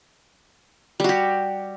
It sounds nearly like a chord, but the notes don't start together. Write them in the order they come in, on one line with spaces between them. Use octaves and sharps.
G3 F#4 G4